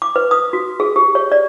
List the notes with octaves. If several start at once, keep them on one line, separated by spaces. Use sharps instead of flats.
D6
B4
D#6
F#4
G#4
G4
C#5
D5